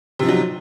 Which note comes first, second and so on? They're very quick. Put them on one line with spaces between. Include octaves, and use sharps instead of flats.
C3 F3 D#4 F#3